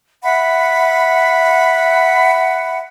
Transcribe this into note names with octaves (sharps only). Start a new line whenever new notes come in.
E5 F#5 B5